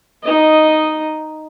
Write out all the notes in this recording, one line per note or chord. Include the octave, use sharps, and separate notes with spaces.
D#4 D#5